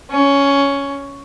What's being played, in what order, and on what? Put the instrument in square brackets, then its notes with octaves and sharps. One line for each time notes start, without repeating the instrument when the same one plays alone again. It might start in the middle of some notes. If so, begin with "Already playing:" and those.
[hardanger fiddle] C#4